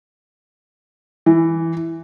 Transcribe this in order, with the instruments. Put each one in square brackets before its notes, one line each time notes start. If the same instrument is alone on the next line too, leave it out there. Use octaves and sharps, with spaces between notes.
[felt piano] E3